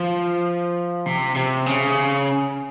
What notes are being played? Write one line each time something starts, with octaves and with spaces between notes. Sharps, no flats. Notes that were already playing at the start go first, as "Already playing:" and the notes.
Already playing: F3
C3
C3
C#3